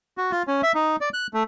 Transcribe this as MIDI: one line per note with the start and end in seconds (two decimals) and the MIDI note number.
0.18 0.32 66
0.32 0.43 65
0.47 0.61 61
0.63 0.72 76
0.75 0.96 63
1.01 1.09 74
1.14 1.27 90
1.34 1.43 57